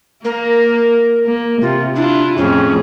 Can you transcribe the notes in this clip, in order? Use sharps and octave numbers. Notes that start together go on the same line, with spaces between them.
A#3 A#4
A#3
C3 F4
D4 E4 F4
F2 A2 C#4 G#4